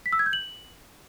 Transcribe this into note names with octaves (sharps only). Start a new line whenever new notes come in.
B6
E6
G#6
G6
F#7